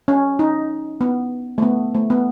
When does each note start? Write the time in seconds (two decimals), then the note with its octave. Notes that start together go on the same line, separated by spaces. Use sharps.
0.08 C#4
0.39 D#4
1.01 B3
1.58 A3
1.62 B3
1.95 A3
2.10 B3